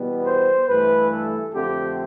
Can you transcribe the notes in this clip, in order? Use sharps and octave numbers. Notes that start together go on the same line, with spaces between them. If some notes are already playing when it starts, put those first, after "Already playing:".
Already playing: E2 B2 G3 B3
C5
G2 E3 A3 B4
A4
F2 D3 A3 C4 G4